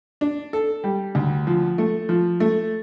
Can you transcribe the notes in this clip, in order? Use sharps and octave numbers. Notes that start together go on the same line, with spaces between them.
D4
A4
G3
D2
F3
A3
F3
A3